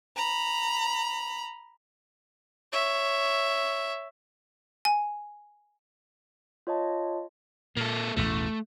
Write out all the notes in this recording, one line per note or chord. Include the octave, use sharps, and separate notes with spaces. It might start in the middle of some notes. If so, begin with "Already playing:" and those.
A#5 B5
C#5 E5
G#5
F4 C#5 D#5 A5
A#2 A#3 A4
A1 E2 B2 A3